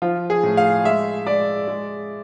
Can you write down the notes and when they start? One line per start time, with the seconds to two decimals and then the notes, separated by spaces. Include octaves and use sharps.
0.02 F3 F4
0.30 G#4
0.43 A2
0.57 F5
0.85 G#3 E5
1.26 G#3 D5
1.68 G#3